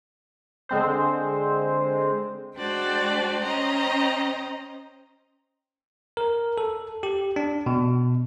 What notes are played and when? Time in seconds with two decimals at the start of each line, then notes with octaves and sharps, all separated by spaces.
0.69 D3 G#3 C4 C5
2.56 G#3 D4 F#4 C5 D5 G5
3.42 C#4 C5 D#5 G5 A#5
6.17 A#4
6.58 A4
7.03 G4
7.36 D4
7.66 B2